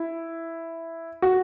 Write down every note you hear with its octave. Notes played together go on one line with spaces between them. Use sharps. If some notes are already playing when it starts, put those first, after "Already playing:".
Already playing: E4
F#4